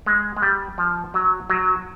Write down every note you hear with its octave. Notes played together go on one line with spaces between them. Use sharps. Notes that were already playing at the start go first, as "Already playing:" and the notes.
G#3
G#3
G3
F3
F#3
F#3